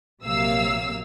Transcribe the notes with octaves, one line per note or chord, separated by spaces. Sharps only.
A#1 C3 F#3 A#3 F5 E6